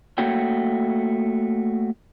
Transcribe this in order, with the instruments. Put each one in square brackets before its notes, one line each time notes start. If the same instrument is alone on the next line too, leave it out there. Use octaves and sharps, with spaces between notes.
[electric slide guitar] A3 A#3 F#4 C#5 G5